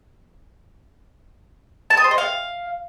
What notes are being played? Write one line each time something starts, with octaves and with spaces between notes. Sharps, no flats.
A5
D#6
C5
D#5
F5